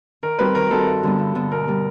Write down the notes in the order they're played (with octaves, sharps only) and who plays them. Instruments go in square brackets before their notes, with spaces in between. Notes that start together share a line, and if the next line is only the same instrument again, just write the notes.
[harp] D#3 [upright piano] A#4
[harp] G3 C4 D#4 F#4 [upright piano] B4
[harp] D#3 [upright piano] A#4
[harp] G3 C4 D#4 F#4 [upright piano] A4
[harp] G2
D3 G3 B3
G2
D3 G3 B3
[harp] B2 [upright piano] A#4
[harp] G3 B3